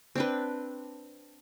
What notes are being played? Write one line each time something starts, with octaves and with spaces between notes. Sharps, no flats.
C4 D4 B4